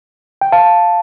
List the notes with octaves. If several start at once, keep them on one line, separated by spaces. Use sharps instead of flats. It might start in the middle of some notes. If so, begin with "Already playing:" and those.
G5
F5 A5